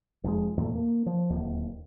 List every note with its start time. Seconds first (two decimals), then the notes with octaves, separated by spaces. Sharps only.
0.24 F1 F2 C#3 G#3
0.57 E2 A#2 G#3 A3
0.75 A#3
1.06 F3
1.30 D1 D#2